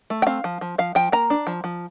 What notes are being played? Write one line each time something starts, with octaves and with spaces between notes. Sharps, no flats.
A3
G5
C4 F5
F3
F3
F3 F5
F3 G5
A#3 A#5
D4
F3
F3